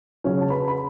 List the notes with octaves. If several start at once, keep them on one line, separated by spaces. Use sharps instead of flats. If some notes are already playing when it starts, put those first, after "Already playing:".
C#3 F#3 C#4 C#5
A5
B4 B5
B5